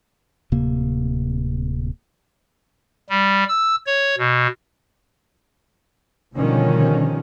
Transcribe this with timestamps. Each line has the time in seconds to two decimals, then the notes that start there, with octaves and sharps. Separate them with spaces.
0.52 D1 C3 A#3
3.09 G3
3.49 E6
3.87 C#5
4.18 B2
6.34 B2 D3 D#3 F3 G3 C#4